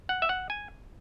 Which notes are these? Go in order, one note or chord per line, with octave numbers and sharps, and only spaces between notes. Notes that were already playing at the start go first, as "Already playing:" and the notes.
F#5
E5
F#5
G#5